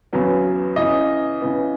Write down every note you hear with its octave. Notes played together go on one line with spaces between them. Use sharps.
E2 C#3 F#3 B3
C#3 E3 B3 D#5
C#3 E3 B3